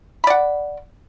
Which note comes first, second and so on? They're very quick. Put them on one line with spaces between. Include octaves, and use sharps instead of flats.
B5 D5 F#5